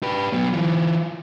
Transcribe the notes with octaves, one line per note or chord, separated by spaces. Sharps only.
G4 B4
F#3 B3
E3 F4